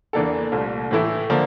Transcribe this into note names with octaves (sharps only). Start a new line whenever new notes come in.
E2 E3 A#3 D4 A4
C2 A#2 A3
A2 E3 A3 E4
D3 F3 A#3